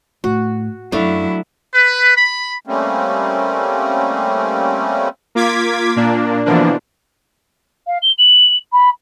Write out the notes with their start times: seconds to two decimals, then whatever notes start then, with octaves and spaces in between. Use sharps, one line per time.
0.24 A2 F#4
0.92 F#2 F#3 A3 D4 E4 F5
1.74 B4
2.16 B5
2.66 G3 A3 A#3 C4 C#4
5.35 A#3 F4 D6 G#6 B6
5.96 A#2 A#3 D4
6.46 B2 D3 E3 F3 A#3 D4
7.87 F5
8.02 G7
8.18 F#7
8.73 B5